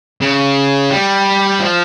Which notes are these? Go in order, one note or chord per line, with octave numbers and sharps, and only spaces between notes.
C#3
G3
F3